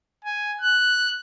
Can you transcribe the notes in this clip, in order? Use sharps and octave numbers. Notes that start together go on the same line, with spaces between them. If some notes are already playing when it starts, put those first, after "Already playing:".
G#5
F#6